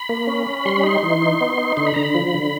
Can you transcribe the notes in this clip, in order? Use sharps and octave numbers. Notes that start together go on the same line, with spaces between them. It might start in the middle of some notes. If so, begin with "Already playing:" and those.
Already playing: B5
A#3
C#4
C#4
G3 C6
B5
D#4 C6
E3
D#4
B3
D#4
D3 C6
B5
D3 A#5
B5
F3
D3